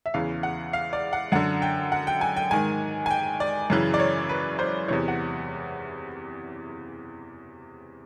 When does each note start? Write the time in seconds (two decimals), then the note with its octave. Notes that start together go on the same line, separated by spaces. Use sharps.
0.06 E5
0.14 E2 C#3 E3 F5
0.43 F#5
0.73 F5
0.93 D5
1.13 F#5
1.32 F#2 D3 F#5
1.62 G5
1.92 F#5
2.07 G5
2.21 G#5
2.36 G5
2.51 G#2 D#3 G#5
3.06 G#5
3.10 G5
3.40 D5
3.70 F#2 C#3 E3
3.94 D5
3.99 C#5
4.29 B4
4.59 C5
4.88 E2 C3 E3 C#5
5.08 F#5